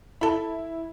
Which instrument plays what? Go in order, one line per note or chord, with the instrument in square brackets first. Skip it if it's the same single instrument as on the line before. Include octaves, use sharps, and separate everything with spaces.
[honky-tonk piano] E4 [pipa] A4 B5